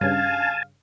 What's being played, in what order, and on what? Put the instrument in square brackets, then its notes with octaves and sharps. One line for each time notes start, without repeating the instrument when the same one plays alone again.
[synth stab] G2 C#3 [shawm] F5 [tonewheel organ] G#5 A5